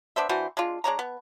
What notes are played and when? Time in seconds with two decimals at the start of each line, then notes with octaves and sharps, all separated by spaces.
0.16 B3 D4 C5 E5
0.29 E3 D4 F#4 C5
0.57 G#3 D4 F4
0.84 G#3 D4 C#5 A#5
0.99 B3